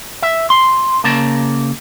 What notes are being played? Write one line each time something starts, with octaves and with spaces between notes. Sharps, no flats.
E5
C6
C#3 A#3 A5